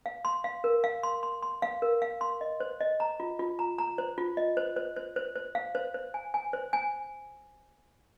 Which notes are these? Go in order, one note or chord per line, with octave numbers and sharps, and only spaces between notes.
F5
C6
F5
A#4
F5
C6
C6
C6
F5
A#4
F5
C6
D#5
C5
D#5
A#5
F4
F4
A#5
A#5
C5
F4
D#5
C5
C5
C5
C5
C5
F5
C5
C5
G#5
G#5
C5
G#5